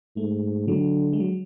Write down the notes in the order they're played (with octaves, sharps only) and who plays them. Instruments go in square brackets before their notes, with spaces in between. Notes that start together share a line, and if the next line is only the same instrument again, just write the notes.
[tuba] G#2 [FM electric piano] A3
[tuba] D3 [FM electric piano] F#3
[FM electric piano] G#3
F#3